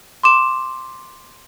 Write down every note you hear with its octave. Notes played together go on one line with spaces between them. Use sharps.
C6 D6 E7